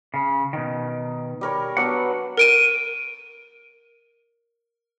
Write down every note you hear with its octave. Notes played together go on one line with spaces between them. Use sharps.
C#3
B2 D#3
G3 A#4 C#5
F#3 B3 D4 F#5
A#4 D7 D#7